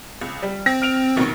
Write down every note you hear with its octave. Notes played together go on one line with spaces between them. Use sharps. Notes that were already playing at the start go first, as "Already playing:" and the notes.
C#2
G3
C4 A#6
F6 D7 F7
A#1 B2 D#3